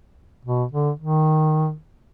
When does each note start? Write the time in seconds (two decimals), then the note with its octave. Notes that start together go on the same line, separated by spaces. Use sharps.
0.45 B2
0.72 D3
0.99 D#3